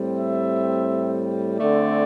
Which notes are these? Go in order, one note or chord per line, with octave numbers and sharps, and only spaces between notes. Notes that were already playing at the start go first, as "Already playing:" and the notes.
Already playing: A2 G3 C4
E5
D3 A3 C4 D5